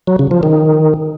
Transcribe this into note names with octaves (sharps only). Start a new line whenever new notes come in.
F#3
C#3
F3
D#3